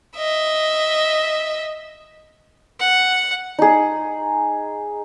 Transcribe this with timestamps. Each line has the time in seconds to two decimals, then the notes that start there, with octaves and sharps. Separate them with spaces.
0.16 D#5 E5
2.79 F#5
3.59 D#4 G#4